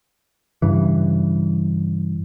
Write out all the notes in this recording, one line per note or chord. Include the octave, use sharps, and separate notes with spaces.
G2 C#3 E3